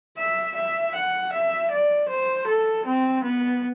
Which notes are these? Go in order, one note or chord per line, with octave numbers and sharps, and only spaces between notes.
E5
E5
F#5
E5
D5
C5
A4
C4
B3